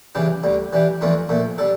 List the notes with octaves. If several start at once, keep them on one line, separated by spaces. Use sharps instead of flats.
C#3 E3 G3 D4 G4
D2 D3 G3
E3 G3 D4 G4
F2 E3 A3 D4 F4
A#2 F3 A3
G3 D4 A4